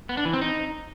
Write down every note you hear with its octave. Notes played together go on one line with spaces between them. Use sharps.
B3
D4
E3
C4
D#4